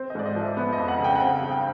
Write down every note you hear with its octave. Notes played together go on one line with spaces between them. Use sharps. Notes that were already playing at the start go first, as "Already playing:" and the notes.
Already playing: C4 C5
D#5
G#2 D5
D#5
F3
E5
B3
D#5
F2
F#5
C#3
G5
F#5
C4 G5
G2
G5